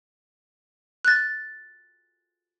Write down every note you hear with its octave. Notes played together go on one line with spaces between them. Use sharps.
F#6 A6